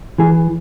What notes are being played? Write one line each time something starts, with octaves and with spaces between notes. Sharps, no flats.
E3 G#4